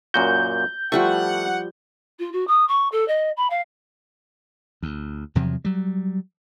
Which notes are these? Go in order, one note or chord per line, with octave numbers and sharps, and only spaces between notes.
F#2 A#2 F#4 G6
F3 G3 A3 E4 F#5 C#6
F4
F#4
D#6
C#6
A4
D#5
B5
F5
D2
E2 C3 F3 F#3
F#3 G3